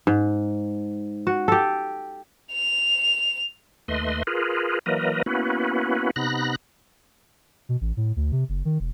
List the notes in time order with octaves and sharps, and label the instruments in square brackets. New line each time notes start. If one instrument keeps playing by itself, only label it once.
[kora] G#2
F#4
G4 A4
[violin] F7
[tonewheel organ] D#2 A3 B4 D#5 C6
F4 G#4 A#4 B4
E3 F#3 A#3 A#4 B4 D#5
A#3 B3 C#4 E4 F#4 B4
C3 B3 D#4 B5 F#6 A#6
[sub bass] B2
A1
A2
D2
C3
F#1
D#3
E1